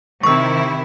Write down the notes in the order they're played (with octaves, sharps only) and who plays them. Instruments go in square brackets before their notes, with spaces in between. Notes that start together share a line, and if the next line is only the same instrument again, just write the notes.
[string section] C3 D#3 E4 [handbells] C#6 E6